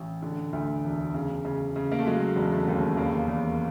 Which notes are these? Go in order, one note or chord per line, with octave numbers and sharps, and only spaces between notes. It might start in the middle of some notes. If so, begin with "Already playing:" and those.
Already playing: A1
D3
D2
E1
C#3
C#3
C#3
A#3
A3
F#3 G#3
E1
A3
D#2
E2 A#3
E2